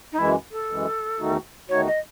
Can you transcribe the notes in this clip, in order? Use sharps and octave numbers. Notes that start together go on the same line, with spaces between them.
D#4
F#2 E3 G#3 E4
A4
F#2 E3 G#3
E2 D#3 A3 D#4 F#4
E2 D#3 A3 D#4 F#4 C#5
D#5